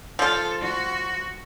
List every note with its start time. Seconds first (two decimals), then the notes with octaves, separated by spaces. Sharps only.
0.19 F3 F4 A4
0.61 F#4